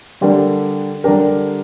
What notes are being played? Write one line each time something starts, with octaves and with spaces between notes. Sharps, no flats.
D3 G3 D4 G4 A#4
D3 G3 D4 G4 A#4